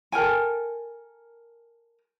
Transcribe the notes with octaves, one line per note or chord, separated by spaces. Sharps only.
A4 A#4 G5 G#5